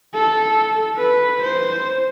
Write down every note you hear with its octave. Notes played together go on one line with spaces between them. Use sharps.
A4
B4
C5